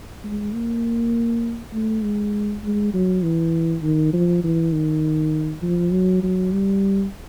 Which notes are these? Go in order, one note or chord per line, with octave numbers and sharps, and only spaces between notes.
G#3
A#3
A3
G#3
G#3
F#3
E3
D#3
F3
E3
D#3
F3
F#3
F#3
G3